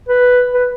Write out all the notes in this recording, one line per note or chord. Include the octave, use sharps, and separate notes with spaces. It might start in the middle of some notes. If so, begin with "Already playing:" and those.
B4
B4